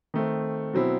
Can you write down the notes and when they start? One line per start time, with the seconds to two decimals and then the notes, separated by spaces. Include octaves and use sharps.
0.14 D#3 A3 C4
0.73 B2 F#3 C4 E4